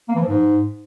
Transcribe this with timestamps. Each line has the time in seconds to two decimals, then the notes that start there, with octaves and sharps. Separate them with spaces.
0.09 A#3
0.15 E3
0.22 F3
0.28 G#2